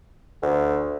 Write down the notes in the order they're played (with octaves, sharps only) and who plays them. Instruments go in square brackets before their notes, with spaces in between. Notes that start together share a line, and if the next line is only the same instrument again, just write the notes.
[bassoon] D2